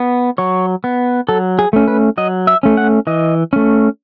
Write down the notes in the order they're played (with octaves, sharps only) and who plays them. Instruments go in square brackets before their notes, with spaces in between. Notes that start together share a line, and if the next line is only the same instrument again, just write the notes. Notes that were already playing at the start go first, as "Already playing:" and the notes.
Already playing: [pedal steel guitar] B3
F#3 C#5
B3
F#3 A4
G#4
A3 C#4
B4
F#3 D#5
E5
A3 C#4
F#5
E3 D#5
A3 C#4